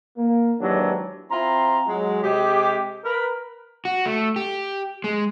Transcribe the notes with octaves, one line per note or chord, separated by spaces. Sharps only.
A#3
D#2 G#2 E3 F#3 D4 G4
C4 E4 F4 A#5 C6
F#3 G#3
C3 G#3 G4
A#4 B4
F#4
A3
G4
G#3